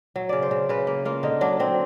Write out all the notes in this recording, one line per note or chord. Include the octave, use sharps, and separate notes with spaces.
F#3
C#3 D5
C5
C#3
C#3 B4
A#3
A#3 F4
D3 D#4
F#3 D4
F#3 C4